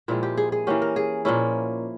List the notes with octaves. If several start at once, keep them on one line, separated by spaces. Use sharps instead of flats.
A#2 F3 G#3 C4 E4
G4
G#4
G#4
E3 A#3 C#4 G4
A#4
G#4
A#2 F3 A#3 C#4 E4